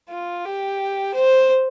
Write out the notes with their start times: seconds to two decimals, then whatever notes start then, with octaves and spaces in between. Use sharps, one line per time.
0.09 F4
0.45 G4
1.15 C5